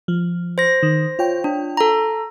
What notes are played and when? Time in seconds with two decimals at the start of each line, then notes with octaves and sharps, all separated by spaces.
0.08 F3
0.58 C5 A#6
0.83 D#3
1.19 F4 C#5 G5
1.44 D4
1.77 A4 A#5